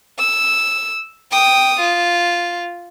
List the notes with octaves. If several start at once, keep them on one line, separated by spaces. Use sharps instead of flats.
E6
G5 D#6
F4